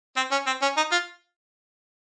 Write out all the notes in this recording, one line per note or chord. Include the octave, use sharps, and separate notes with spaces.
C4
C#4
C4
C#4
D#4
F4